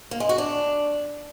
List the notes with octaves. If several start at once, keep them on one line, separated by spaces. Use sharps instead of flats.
A#3
G#3
F#4
D4